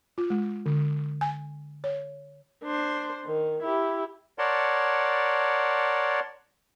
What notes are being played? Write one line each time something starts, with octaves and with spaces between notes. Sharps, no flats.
F4
G#3
D3
G#5
C#5
D4 C5
D#3
E4 G4
A#4 C#5 D5 F#5 A5 C6